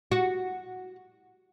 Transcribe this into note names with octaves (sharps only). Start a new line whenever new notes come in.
F#4